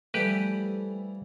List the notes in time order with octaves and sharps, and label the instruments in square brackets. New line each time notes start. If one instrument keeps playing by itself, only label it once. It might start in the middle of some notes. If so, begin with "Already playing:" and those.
[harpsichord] E3 F3 G3 [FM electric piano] A3 A4 [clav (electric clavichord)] G4 B4